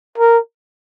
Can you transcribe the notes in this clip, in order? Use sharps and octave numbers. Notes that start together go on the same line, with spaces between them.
A#4